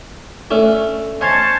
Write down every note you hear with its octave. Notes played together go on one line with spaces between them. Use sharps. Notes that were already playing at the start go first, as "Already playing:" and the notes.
A3 C#4 D4
C#4 C5 D#5 G#5 A5